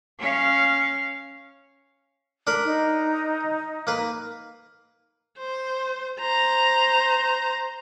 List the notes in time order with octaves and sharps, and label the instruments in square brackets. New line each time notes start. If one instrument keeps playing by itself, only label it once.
[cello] C#4 F5
[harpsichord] D4 A#4 B5
[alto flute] D#4
[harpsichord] A#3 B4
[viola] C5
C5 A#5